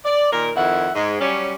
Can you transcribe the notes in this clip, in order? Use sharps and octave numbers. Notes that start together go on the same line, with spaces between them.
D5
A#2 D#3 A#4
F2 D#3 E4 E5 F#5
G#2 G#3
F#3 G3 C#4